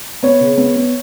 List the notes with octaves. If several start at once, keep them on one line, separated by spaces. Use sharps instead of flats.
B3 C#5
C#3
B3
B3